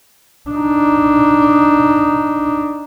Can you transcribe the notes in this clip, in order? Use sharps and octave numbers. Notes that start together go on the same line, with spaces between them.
D4 D#4